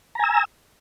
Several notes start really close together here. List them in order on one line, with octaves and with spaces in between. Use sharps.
A#5 G#5 E6